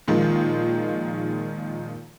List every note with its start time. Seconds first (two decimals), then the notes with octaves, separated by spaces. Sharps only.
0.08 A#2 D#3 F3 G#3